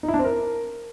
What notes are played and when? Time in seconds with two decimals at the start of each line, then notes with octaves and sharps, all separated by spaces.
0.03 D#4
0.08 E4
0.14 D4
0.19 C4
0.24 A#4